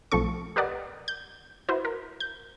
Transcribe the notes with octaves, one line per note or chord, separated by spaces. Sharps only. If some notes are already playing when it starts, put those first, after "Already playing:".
B1 F3 A3 C4 A4 C#6
G4 A#4 B4 D5 D#5 F#5
G6
E4 F#4 B4 C5
A#4
G6